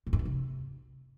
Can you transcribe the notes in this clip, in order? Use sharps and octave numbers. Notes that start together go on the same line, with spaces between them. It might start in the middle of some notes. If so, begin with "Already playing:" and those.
A#2
G2
E3
C3